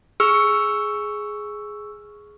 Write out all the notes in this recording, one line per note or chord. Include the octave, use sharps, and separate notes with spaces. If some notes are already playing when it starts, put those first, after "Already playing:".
G#4 C#6 E6 F6